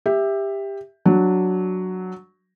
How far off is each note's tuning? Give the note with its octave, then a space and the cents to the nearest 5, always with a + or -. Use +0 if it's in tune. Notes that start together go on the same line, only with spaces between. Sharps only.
G4 +15 E5 +0
F#3 +0 D4 +5